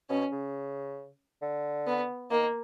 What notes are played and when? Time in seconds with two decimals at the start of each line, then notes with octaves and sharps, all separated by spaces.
0.09 B2 C#4
0.31 C#3
1.42 D3
1.87 B3
2.31 D#3 A#3